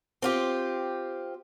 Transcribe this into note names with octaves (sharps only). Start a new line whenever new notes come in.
C4 F4 G4